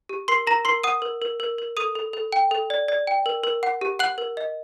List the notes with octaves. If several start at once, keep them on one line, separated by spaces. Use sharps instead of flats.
G4
A#4 C6 C7
A#4 A#5 A#6
A#4 C6 C7
F#5 D#6 D#7
A#4
A#4
A#4
A#4
A4 D#6 D#7
A4
A4
G5
A4
D5
D5
G5
A#4
A#4
F#5
G4
F#5 F#6 F#7
A#4
D#5